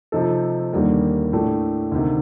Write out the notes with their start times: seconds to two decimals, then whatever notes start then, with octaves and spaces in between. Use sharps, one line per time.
0.12 C3 F3 C4 D#4 A4
0.73 D#2 D3 G3 A#3
1.33 A2 A3 D4
1.92 D2 C3 D#3